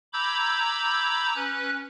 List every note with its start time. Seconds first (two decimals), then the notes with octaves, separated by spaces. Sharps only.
0.13 A#5 B5 D6 E6 G6 G#6
1.35 C#4 B4 F#6